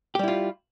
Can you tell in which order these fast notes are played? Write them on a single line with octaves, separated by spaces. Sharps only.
G4 G3 E4 F4